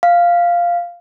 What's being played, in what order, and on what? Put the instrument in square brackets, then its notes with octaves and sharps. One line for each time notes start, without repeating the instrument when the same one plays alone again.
[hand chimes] F5